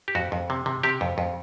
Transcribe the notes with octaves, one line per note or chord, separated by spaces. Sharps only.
G4
F2 F#4
F2
C3
C3
C3 G4
F2
F2